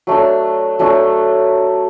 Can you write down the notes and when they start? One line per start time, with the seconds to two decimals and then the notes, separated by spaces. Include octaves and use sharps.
0.07 F#3 A3 D4
0.79 F#3 A3 D4